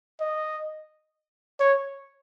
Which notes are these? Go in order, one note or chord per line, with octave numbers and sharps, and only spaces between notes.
D#5
C#5